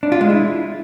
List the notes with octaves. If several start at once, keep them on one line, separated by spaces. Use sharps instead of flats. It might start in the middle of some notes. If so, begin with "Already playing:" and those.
D4
F4
G#3
E4